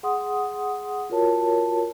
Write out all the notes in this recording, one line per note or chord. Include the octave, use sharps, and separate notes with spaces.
G#4 F#5 C6 D#6
F4 F#4 A#4 C#5 A5